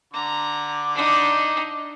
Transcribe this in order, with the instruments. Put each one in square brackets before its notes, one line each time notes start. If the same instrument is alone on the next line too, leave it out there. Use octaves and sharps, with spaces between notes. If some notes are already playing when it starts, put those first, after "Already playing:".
[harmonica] D3 D6 [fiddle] A#5
[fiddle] D4 D#4